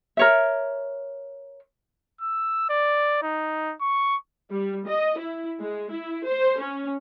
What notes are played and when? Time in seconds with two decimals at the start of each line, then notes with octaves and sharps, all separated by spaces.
0.17 A#4 C#5 E5
2.22 E6
2.70 D5
3.23 D#4
3.81 C#6
4.51 G3
4.87 D#5
5.19 E4
5.61 G#3
5.91 E4
6.27 C5
6.60 C#4